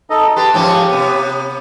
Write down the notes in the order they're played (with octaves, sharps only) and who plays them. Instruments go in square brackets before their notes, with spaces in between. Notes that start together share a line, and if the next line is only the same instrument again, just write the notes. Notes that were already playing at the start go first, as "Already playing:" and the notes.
[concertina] D#4 A4 D#5
[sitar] G4 [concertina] B4 A5 C6
[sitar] G#2 F3 C#4 [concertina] G4
[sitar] C3 B3